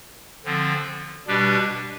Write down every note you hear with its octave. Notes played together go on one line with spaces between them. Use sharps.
D3 F3 C4
B2 G3 D4 G4 B4